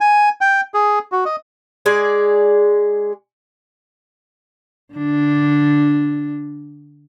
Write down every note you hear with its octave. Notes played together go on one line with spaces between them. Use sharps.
G#5
G5
G#4
F#4
D#5
G#3 G#4 D5
D3 D4